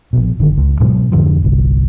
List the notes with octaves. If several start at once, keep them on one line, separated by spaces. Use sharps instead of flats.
A#1 B2
F#1 D3 D#3
C#2
G#2 B2 F#3 G#3
F2 G#2 D3 F3
G1 C2